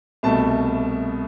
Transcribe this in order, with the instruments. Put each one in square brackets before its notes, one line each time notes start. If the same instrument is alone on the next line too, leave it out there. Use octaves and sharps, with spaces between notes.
[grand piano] C2 B2 A3 A5